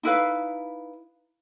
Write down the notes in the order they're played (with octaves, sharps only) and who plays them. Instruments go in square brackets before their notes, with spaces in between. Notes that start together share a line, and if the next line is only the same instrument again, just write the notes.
[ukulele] D#4 E4 B4 F5